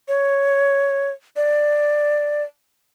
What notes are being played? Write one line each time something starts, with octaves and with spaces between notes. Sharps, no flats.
C#5
D5